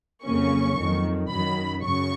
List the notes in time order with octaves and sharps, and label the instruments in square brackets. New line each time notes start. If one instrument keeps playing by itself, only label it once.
[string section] F2 C#3 F#3 A#3 C#4 C#6
F2 D#3 F#3
F#2 D#3 F#3 B5
F#2 C#3 C#6